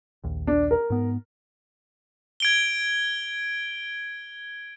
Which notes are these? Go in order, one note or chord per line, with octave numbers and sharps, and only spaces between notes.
A#1 D#2
D4
A#4
G#2 B3
G#6 D7 G7